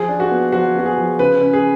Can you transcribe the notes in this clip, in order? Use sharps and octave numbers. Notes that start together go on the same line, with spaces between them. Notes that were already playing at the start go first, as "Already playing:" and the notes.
Already playing: F3 G#4
D4
F#4
B3
F3 F#4
B3 F#4
G#4
F3
C#3 B4
C#4
G#4